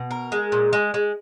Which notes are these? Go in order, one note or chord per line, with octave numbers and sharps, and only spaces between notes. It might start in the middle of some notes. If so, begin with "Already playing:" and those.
Already playing: B2
A#4
G#3
A#2
G#3
G#3